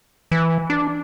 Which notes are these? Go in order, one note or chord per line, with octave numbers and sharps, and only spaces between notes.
E3
D4